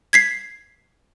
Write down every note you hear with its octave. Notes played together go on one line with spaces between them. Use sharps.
G#6 B6 C7